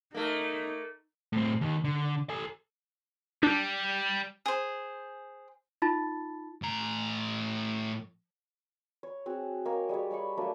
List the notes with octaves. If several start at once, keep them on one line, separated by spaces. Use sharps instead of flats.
A3 A#3 D#4
A2 C4
D#2 D#3
D3
A4 G#5
G3 D4
G#4 C5
D#4 F4 A5 B5 A6
A2 A#5
C#5
C4 F#4 G#4
G#3 A#3 A#4 C#5
G3 G#3 G#4 C#5
G3 G#3 B5 C#6
F#3 A3 A#3 D4